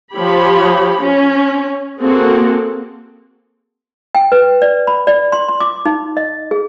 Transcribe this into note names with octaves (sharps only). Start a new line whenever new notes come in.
F3 G4 C#5 B5
C#4
A#3 C4 F#4 G#4 A4
G5
B4
D5
B5
D5
C6
C6
D6
D#4
D#5
G#4